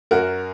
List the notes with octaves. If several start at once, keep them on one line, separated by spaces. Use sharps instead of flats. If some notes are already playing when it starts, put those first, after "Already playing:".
F#2 F#4 A#4